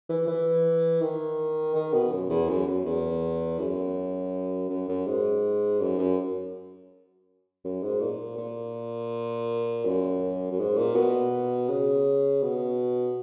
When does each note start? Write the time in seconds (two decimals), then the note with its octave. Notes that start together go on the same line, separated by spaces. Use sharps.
0.09 E3
0.28 E3
1.01 D#3
1.75 D#3
1.94 B2
2.12 F#2
2.30 E2
2.48 F#2
2.67 F#2
2.85 E2
3.59 F#2
4.69 F#2
4.88 F#2
5.06 G#2
5.80 F#2
5.99 F#2
7.64 F#2
7.82 G#2
8.01 A#2
8.37 A#2
9.85 F#2
10.52 F#2
10.59 G#2
10.77 A#2
10.95 B2
11.69 C#3
12.43 B2